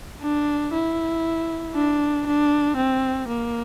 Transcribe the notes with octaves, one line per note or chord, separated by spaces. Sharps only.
D4
E4
D4
D4
C4
A#3